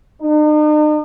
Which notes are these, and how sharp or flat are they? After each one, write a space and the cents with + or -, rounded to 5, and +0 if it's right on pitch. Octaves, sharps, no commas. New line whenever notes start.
D#4 -45